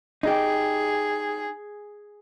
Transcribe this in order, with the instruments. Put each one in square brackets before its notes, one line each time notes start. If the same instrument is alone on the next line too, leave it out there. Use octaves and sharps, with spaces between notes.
[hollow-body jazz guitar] D#4 G4 [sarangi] G#4